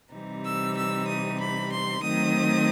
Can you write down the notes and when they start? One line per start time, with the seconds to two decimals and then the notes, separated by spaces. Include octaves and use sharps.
0.13 C3 E3 G3 C4 D#4
0.45 E6
0.76 E6
1.07 D#6
1.40 B5
1.71 C6
2.03 D#3 F#3 A3 C4 D#6